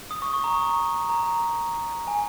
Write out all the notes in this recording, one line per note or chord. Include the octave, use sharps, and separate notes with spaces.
D#6
C#6
C#6
A#5
A#5
G#5